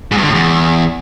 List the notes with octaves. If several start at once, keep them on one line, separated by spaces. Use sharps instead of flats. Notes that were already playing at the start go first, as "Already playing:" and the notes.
G#2
G2
D3
A2
E2